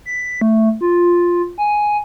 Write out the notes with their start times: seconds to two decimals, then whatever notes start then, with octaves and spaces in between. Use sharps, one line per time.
0.06 B6
0.41 A3
0.81 F4
1.58 G#5